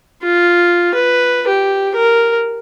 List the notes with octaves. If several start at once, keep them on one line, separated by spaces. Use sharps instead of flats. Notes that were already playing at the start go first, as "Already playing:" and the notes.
F4
B4
G4
A#4